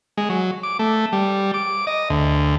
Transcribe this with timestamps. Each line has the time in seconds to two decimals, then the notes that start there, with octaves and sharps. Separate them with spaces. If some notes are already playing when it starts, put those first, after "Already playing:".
0.17 G#3
0.30 F#3
0.63 D6
0.79 A3
1.13 G3
1.54 D6
1.87 D#5
2.10 D2